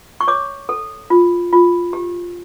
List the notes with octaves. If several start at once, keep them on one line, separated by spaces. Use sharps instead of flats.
C#6
C#5 D6
A4
F4
F4
G4